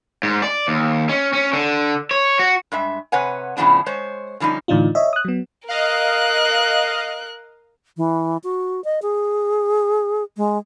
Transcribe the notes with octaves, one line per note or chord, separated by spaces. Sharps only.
G#2
D5
D#2
C#4
C#4
D3
C#5
F#4
G2 G#3 E5
C3 B4 C#5 F#5 G#5
A2 C#3 F3 B3 D4
G#3 C5 C#5
D3 F3 G3 C#4 D#4
A2 D3 E3 D4 D#4 F4
C#5 D#5 E5
D#6 F#6
F#3 B3
A#4 D#5 F5 F#6
E3
F#4
D#5
G#4
G#3